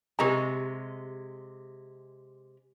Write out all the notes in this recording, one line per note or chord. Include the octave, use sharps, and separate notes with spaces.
C3 G#3 G4 A#5